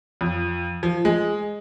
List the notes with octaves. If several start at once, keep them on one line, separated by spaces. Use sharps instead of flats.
F2
F3
G#3